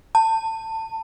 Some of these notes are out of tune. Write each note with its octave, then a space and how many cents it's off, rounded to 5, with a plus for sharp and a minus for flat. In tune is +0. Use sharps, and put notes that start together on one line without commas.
A5 +25